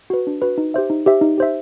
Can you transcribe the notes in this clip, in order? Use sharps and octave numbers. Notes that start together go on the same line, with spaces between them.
F#4 B4
D4
F#4 B4
D#4
G4 C5 E5
D#4
G4 C5 E5
D#4
G4 C5 E5